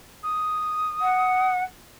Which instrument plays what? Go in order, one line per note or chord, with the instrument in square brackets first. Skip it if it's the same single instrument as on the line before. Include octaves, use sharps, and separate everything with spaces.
[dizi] D#6
[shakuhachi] F#5